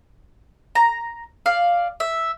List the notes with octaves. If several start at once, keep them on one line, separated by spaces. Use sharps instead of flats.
A#5
D5 F5
E5